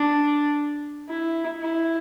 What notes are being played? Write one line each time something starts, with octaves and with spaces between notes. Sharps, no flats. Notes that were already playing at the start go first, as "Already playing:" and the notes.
Already playing: D4
E4
E4